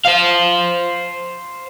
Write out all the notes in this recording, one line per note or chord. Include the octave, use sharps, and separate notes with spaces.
C5 F5